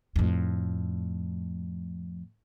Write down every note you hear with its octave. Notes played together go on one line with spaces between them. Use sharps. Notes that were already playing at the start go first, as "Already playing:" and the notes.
F2 A2